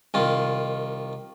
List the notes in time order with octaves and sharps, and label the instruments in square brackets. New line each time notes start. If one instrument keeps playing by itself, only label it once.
[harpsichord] C2 D#3 F4